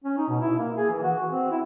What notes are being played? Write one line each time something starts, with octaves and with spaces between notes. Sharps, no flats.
C#4
D#4
B2
E4
A#3
G#4
E3
F#4
C4
E4